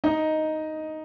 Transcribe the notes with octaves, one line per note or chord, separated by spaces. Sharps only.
D#4 D#5